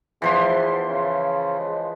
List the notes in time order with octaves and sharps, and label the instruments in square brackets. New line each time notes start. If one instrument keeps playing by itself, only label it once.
[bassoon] E2 [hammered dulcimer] E3 F3 C6
[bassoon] C#3
G#3